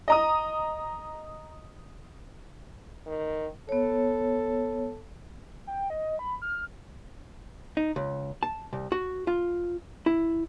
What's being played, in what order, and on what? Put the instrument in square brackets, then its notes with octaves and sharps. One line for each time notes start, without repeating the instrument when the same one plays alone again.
[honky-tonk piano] D#5 A#5 D#6
[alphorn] D#3
[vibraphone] B3 C#5 [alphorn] A4
[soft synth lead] G5
D#5
B5
F6
[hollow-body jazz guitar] D#4
C#2
A5
C2
F#4
F4
E4